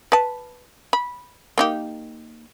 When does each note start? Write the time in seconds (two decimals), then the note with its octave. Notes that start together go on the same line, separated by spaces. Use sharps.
0.12 B4 A5
0.93 B5
1.58 A#3 D#4 G4